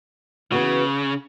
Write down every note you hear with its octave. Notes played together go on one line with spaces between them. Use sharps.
C#3 E3 B3 F#4